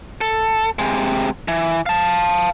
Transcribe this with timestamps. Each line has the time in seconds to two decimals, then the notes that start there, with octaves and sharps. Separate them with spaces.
0.21 A4
0.79 C3 G#3
1.48 E3
1.86 F5 A5